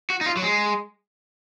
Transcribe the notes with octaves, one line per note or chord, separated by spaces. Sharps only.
F#4
D#4
F4
F#3
G#3